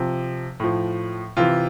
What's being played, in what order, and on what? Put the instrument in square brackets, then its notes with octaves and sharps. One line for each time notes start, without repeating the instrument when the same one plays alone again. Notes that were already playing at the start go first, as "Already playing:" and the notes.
Already playing: [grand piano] C3 F3
A2 F3
C3 E3 F4